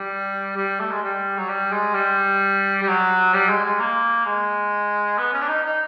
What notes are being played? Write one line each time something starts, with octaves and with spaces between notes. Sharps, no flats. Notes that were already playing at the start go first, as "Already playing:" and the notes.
Already playing: G3
G3
A3
G#3
G3
F#3
G3
G#3
G3
G3
F#3
G3
G#3
G#3
A#3
G#3
B3
C#4
D4
D#4
D#4